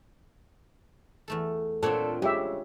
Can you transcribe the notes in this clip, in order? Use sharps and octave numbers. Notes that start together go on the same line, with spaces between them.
E2 A3 A4
A#2 C4 D4 A4 C#5 F#5
C#3 G#3 G4 E5